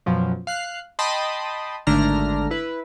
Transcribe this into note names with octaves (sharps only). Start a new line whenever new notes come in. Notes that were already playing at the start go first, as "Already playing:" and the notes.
F#2 B2 F3 F#3
F5 F#6 C7
D#5 G5 A5 B5 C6 D#6
G#1 D3 A3 D4 A#5 F6
E4 B4